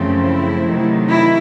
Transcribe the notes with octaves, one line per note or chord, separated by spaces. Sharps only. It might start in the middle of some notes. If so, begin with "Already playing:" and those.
Already playing: F#2 C#3 F3 A3 C4
E4
C3 D#3 F#3 A3
E4